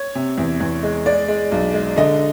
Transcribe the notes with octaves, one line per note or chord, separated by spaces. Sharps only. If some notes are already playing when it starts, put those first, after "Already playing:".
Already playing: C#5
C3
E2
E2
G#3
G#3 D5
G#3
B1
G#3
D3 D#5